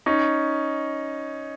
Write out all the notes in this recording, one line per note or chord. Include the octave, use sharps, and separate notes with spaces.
C#4 D#4